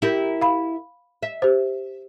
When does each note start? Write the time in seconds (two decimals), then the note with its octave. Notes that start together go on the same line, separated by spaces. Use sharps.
0.02 E4 G4 A#4
0.41 F5 B5
1.23 E5
1.42 G4 C5